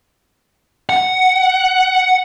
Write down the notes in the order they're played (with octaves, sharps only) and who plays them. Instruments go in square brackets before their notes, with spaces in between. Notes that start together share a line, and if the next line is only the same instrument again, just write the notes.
[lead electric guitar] F#5